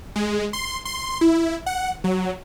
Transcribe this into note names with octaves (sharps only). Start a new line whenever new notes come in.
G#3
C6
C6
E4
F#5
F#3